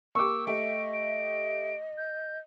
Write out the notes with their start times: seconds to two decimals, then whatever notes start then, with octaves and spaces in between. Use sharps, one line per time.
0.15 A#3 G4 C#6 D6 E6
0.47 A3 G4 D#5 E5 D7
0.93 D7
1.97 G6